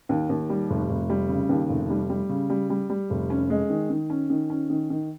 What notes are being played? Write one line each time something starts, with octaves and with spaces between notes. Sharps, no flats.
D#2
D#2
G3
F1
F1
G3
C#3
D#2
F1
G3
G3
C#3
G3
G3
G3
F1
C#4
G#3
D#3
D#3
C#4
D#3
C#4
D#3
D#3